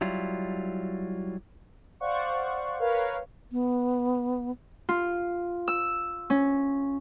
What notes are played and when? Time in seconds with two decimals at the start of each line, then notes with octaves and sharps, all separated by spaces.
0.01 F#3 G3 E4 F4
2.00 C5 D5 F5 F#5 C#6
2.80 A#4 B4 C#5 F5
3.52 B3
4.89 F4
5.68 E6
6.30 C#4